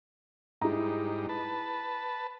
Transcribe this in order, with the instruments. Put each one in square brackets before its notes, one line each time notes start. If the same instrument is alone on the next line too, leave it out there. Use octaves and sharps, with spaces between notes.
[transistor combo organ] G#2 G3 D#4 [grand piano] E4 G#4 A#5
[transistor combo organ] B4 A5